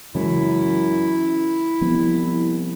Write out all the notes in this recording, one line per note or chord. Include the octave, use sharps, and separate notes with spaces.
F#2 C#3 E3 G#3 E4
C2 F3 B3 C4